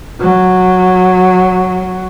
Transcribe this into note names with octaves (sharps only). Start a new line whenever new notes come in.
F#3